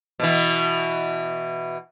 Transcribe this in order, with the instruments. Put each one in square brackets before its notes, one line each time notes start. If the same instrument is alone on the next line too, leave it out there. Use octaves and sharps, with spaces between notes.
[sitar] B2 E3